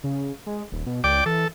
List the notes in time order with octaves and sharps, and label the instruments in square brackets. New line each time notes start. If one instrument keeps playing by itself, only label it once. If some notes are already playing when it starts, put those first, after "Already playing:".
[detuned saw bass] C#3
G#3
D#1
B2
[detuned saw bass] C#2 [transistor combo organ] D5 G5 D6
[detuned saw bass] E3 [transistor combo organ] A4